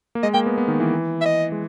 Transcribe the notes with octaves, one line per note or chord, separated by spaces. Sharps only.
A#3
G#3 D#5
A#3 G5
B3
B3
D#3
E3
E5
D#5
G#3